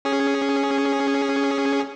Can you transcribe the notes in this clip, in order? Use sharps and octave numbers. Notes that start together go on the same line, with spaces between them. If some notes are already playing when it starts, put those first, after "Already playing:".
C#4 G#4